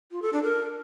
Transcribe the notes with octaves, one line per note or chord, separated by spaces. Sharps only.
F4
A4
D4
A#4